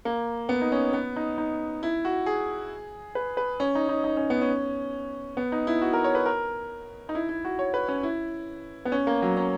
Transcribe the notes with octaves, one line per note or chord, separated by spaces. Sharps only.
A#3
B3
D#4
C#4
B3
D#4
D#4
E4
F#4
G#4
B4
B4
C#4
D#4
D#4
D#4
C#4
B3
C#4
B3
D#4
E4
F#4
A#4
C#5
B4
A#4
D#4
E4
E4
F#4
C#5
B4
C#4
E4
B3
C#4
A#3
F#3
C#4